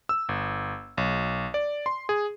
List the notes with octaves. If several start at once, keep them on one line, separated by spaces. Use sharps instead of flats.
E6
G1
B1
D5
C6
G#4